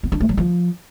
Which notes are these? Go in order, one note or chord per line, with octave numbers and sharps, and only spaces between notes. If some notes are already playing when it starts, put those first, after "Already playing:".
B3
D4
A3
F#3
F3